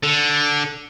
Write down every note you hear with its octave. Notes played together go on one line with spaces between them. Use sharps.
D3